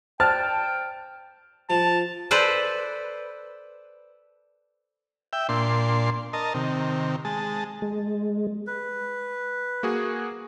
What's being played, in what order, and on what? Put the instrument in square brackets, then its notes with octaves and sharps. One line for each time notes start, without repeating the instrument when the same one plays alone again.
[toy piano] C5 D5 [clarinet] G5 [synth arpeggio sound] A5 [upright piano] F6
[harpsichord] F3 [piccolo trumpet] A5
[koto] A4 B4 C5 D5
[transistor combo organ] E5 G5
A#2 D4 C6
A#4 D#5 A5
C3 D#3
G#3 A5
[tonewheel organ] G#3
[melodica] B4
[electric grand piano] A#3 F#4 G#4